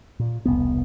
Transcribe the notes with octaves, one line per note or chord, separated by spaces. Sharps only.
A#2
E1 C2 B3